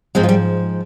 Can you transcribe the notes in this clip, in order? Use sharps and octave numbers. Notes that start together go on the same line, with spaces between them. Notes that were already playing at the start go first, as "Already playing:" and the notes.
G#2 F3 G#3 C4
F4
G3 G4